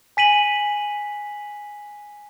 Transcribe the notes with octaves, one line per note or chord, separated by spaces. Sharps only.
G#5 B6 D#7 F#7